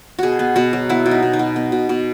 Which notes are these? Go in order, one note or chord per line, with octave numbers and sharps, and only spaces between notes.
B2 F#4 G#4
B3
B2 F#4
F#3
B3 E4
B2
D#4
B2
D#4
B2
B3
B2
B2